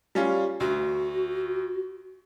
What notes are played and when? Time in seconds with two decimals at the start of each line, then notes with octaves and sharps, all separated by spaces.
0.15 G3 C#4 F4
0.60 D2 F#4